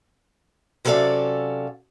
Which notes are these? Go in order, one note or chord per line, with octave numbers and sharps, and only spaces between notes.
C3 F#3 C#4 A4 D5 F5